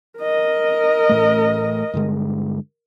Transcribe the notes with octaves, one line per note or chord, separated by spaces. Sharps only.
A#4 D#5
A1 A2 A3
G2 D3 G#3